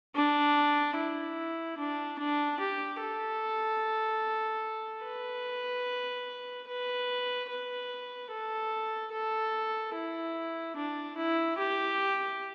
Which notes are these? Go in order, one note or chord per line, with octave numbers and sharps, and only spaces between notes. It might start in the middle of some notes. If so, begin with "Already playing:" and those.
D4
E4
D4
D4
G4
A4
B4
B4
B4
A4
A4
E4
D4
E4
G4